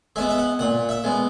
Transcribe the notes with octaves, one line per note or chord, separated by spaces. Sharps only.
G#3 B3 E5
E5
F#5
A#2 F#5
E5
G#3 B3